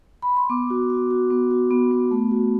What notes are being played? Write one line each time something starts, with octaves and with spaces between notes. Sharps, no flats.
B5
C6
B3 D6
F#4
F#4
F#4
B3
F#4
B3
B3
A3
F#4